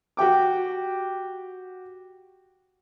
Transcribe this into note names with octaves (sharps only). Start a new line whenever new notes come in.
F#4 G4 G5 D6